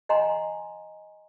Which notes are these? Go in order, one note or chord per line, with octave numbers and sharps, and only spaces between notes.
D#5 F#5 G#5 A#5 C6